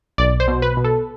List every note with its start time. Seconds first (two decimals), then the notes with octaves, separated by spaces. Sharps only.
0.18 B1 D5
0.40 C5
0.48 B2
0.62 B4
0.77 B2
0.85 A4